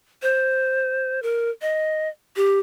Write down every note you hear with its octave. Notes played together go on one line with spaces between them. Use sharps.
C5
A#4
D#5
G4